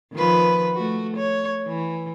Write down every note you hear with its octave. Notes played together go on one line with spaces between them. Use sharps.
D#3 F3 B4
A3 F#4
C#5
E3